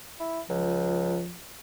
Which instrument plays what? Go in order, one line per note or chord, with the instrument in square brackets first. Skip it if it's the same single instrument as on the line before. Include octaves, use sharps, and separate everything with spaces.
[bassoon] E4
[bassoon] C#2 [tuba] F3